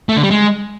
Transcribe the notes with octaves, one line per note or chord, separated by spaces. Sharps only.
A3
D3
G3
G#3